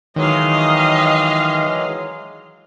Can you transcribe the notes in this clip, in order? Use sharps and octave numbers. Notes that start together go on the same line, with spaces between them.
D#3 E3 F#3 G#3 D#5 F5